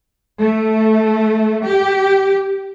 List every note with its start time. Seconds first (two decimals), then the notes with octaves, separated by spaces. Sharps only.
0.40 A3
1.65 G4